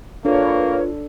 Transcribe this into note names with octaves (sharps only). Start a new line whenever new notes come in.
A#3 D4 F4 A4 B4 C#5